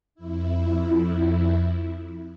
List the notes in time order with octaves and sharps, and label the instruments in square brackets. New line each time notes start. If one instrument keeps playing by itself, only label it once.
[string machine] F2 E4